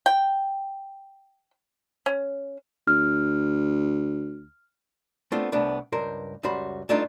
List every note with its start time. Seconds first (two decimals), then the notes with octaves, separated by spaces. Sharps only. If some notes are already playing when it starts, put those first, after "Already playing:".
0.06 G5
2.06 C#4
2.87 D2 F6
5.32 A3 B3 C4 D4 F4
5.52 C2 A3 B3 D4 B5
5.92 C#2 G2 A#4 C5
6.43 C#2 F#2 G3 F#4 C5 B5
6.89 G2 A3 D4 D#4 F4